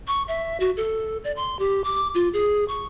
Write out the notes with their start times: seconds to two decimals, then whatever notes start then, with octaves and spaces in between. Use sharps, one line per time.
0.07 C#6
0.28 E5
0.60 F#4
0.77 A4
1.24 D5
1.36 C6
1.59 G4
1.84 D6
2.15 F4
2.33 G#4
2.68 C#6